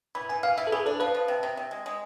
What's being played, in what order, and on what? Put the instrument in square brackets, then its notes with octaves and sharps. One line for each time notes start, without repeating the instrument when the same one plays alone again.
[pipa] E3 [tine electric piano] B5
[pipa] E3 [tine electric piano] G#5
[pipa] E3 [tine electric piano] F5
[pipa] E3 [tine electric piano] E5
[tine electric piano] A4
[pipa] E3 [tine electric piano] G#4
[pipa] D4 [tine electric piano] A4
[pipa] F3 [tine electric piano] B4
[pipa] F3
C3
C3
C3
G#3
G#3